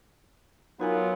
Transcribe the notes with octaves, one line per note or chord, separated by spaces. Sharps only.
F#3 B3 D#4 F4 A#4 G#5